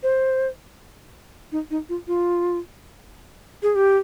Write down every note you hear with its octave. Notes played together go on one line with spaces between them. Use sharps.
C5
D#4
D#4
F4
F4
G#4
G4